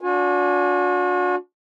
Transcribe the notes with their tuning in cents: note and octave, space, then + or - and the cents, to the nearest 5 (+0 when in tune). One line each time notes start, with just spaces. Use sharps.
D4 -30 F#4 -40 G#5 +0